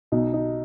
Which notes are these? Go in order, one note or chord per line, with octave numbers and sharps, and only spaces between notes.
B1 D#4
D#4